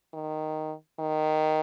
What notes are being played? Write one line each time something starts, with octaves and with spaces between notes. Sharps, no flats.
D#3
D#3